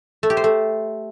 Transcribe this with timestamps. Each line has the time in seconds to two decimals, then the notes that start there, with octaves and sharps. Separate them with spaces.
0.23 A3
0.30 G4
0.37 C5
0.44 A3